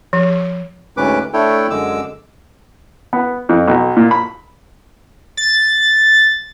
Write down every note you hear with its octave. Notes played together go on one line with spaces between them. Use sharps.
F3
D2 G#2 C#4 B4 D6
A3 D4 E4 A4 C#5 G5
F#2 D3 G#3 D6 E6
B3
F2
B1
A#2
B5
A6